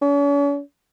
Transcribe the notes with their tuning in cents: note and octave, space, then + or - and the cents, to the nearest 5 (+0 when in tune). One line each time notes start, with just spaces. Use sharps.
C#4 +45